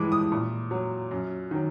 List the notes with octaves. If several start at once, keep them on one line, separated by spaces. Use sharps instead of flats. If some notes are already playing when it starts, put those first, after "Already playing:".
Already playing: G2 E3 G#3 D6
D#6
A#2
F#3
F#2
D#3 F#3